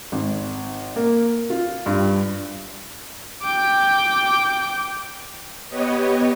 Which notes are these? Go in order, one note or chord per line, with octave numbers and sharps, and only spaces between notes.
G#1
A#3
F4
G2
G5 D6
B3 G4 B4 C#5 D#5